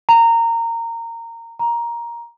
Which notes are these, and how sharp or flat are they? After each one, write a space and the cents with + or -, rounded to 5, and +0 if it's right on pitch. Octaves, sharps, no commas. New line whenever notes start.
A#5 -20
A#5 +10